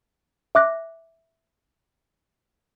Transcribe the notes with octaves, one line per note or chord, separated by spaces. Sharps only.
E5 D6 F#6 A#6